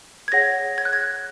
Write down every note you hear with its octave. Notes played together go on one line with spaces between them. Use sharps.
G#6
G#4 C#5 F#5 A#6
G#6
F#6
G#6